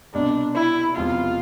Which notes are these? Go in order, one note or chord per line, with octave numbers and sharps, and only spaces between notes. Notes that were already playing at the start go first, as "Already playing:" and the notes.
C2 B2 G3 D4
E4
E1 E2 C3 F3 F4